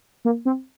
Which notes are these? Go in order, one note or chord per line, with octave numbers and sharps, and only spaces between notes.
A#3
C4